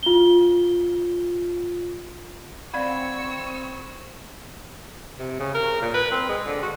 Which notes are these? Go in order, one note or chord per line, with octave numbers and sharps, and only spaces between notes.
F4 G7
C4 D5 F5 F#5 B5 C#6 E6 G#6
C3
C#3
A#4
A#2
B4
C4
G#3
D3
F#4